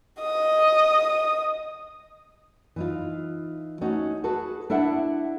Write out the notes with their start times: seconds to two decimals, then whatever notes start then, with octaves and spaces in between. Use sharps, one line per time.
0.22 D#5 D#6
2.76 E3 D#4 F4
3.81 A3 C#4 D#4 F#4
4.24 F#4 G#4 A4 B4
4.70 D4 E4 A4 E5 F#5